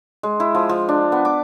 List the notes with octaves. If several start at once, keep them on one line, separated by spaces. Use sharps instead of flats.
G#3
E4
F3
F3
D4
B3
D6